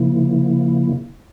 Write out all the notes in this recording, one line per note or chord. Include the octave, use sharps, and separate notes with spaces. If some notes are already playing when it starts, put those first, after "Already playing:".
Already playing: C#3 F3 A#3 E4